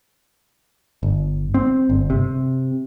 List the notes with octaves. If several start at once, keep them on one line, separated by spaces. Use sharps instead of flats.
G1
C4
G1
C3